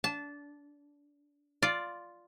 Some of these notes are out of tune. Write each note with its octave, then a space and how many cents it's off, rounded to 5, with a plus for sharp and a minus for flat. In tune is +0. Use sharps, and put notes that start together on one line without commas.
D4 -25 A5 -15
F4 +0 D5 +0